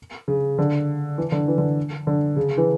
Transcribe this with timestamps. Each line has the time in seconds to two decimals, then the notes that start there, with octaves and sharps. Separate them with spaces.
0.28 C#3
0.58 D3
1.18 E3
1.32 D3
1.48 E3
1.58 D3
2.07 D3
2.36 C#3
2.58 E3